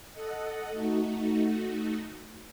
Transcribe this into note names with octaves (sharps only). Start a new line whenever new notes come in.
A4 D#5 F#5
A3 D#4 F#4